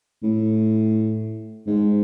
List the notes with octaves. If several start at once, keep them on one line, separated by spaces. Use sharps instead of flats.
A2
G#2